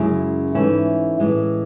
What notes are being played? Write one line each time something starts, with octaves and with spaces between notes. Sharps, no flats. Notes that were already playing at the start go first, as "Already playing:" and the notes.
Already playing: F#2 C#3 G#3 C#4 E4
G#2 E3 A3 C#4 E4
A2 E3 G#3